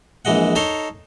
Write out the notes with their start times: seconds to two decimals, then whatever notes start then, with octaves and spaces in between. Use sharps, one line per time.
0.25 A#1 E3 G#3 D#5 F#5
0.55 D#4 A4 C#5 A#5 C6